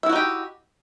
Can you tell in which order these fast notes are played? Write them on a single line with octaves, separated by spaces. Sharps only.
E5 E4 F#4 D#4 G4